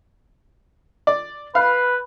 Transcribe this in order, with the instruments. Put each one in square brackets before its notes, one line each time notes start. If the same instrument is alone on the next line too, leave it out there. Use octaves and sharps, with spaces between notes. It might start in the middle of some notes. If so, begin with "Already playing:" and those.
[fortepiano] D5
[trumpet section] B4 [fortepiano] F5